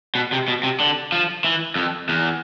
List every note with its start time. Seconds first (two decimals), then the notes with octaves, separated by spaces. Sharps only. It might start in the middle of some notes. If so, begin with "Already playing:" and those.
0.15 B2
0.32 C3
0.48 B2
0.63 C3
0.80 D3
1.12 F3
1.44 E3
1.76 F2
2.09 E2